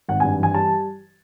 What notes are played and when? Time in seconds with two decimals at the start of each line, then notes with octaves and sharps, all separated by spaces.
0.08 G#1 F#5
0.20 G2 G#5
0.39 E3 G#5
0.54 G3 A5